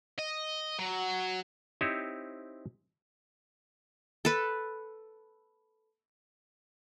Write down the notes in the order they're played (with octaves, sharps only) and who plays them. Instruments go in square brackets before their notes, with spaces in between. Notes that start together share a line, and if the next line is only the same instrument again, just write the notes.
[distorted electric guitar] D#5
F#3
[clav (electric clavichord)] C4 D#4 E4 G4 C5 C#5
[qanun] A4 B4